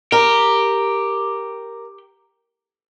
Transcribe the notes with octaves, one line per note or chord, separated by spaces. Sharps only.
G4 A#4